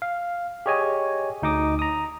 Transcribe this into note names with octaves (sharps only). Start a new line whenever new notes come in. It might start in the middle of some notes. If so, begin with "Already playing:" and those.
F5
G4 G#4 C#5 D#5 G#5
D2 D#4 D#5 D6 D#6
A#5 D#6